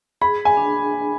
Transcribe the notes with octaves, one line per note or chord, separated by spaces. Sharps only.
G#4 B5
G#5
D4